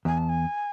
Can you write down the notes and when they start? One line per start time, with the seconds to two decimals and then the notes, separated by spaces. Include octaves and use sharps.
0.05 E2 G#5
0.18 A5
0.29 G#5